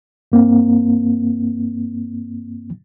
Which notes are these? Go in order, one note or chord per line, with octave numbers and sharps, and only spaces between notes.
G2 A#3 C4